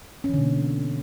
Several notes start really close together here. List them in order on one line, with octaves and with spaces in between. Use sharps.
C#4 E3 D3 B2 A#3